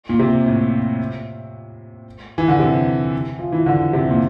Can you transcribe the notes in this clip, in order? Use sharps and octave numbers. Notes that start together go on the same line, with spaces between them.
A#2
C3
A2
E3
D3
C3
F3
E3
D3
C3
A#2